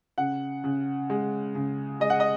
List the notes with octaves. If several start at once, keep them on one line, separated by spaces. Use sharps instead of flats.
C#3 F#5
C#3
G#3
C#3
G#3 D#5
F#5
D#5